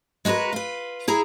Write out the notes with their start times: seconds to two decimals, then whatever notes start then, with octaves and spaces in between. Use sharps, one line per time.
0.25 G#3 F#4 G#4 A#4 B4
0.53 F4 B4
1.08 E4 G#4 A#5